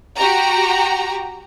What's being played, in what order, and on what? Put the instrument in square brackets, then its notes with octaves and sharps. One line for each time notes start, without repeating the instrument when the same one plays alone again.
[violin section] F#4 G4 A#5